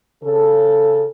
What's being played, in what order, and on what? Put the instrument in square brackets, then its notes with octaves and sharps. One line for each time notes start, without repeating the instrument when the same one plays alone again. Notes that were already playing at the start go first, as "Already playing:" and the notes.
[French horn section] C#3 A4